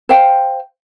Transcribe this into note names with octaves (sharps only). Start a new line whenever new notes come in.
C5 F5 G5